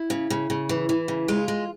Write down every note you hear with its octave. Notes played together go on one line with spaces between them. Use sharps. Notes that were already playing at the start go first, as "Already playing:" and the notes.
Already playing: E4
C#3
C#3
C#3
E3
E3
C#3
G#3 F4
G#3